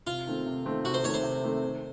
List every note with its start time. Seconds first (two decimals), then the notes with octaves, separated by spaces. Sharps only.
0.07 C3 F4
0.26 D#3 A3 C4
0.46 C3
0.65 D#3 A3 C4
0.84 C3 F#4
0.94 C5
1.04 D#3 A3 C4 C#5
1.14 C5
1.23 C3
1.42 D#3 A3 C4
1.62 D#3